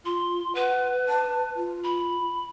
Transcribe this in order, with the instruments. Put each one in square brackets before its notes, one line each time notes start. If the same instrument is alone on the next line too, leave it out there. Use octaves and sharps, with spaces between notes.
[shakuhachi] F4 [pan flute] C6
[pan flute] B4 [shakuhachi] F#5
[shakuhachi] A5
F4
[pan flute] B5